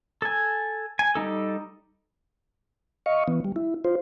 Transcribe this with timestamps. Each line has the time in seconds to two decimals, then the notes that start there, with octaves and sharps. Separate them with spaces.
0.22 A4 G#5
0.99 G#5
1.15 G3 D#4 A4
3.06 D#5 F5 C#6
3.28 E3 B3
3.45 G3
3.56 E4
3.85 F4 C5